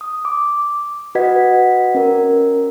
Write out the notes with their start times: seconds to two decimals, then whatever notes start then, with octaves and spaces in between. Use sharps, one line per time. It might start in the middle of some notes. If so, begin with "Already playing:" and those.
0.01 D#6
0.25 D6
1.15 F#4 B4 D#5 F#5 G#6 B6
1.95 C#4 A#4